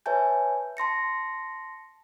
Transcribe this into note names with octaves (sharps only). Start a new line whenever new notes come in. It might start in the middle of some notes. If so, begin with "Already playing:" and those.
B4 C#5 E5 G#5 A5 G6
A5 C6 A#6 C#7